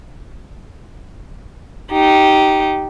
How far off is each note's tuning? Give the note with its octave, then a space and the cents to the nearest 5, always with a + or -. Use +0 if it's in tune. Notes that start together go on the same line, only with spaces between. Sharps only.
D#4 +0 G4 -15